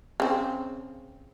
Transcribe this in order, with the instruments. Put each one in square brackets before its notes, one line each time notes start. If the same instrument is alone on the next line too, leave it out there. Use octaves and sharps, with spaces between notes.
[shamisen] C#3 C4